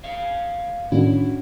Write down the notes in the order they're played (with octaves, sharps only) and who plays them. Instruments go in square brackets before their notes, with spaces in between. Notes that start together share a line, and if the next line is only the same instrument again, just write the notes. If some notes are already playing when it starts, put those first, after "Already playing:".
[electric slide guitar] C#5 F5
[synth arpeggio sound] A2 D#3 [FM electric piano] C#4 D4 F#4 [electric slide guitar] E4